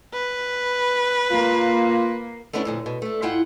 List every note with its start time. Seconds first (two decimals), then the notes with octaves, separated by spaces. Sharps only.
0.14 B4
1.32 A#3 F4
2.53 A3 B3 C#4 D4 E4
2.65 F2 A#2 D3
2.86 B2
3.02 A3 D4
3.22 G#2 E4 F4 F#5 G5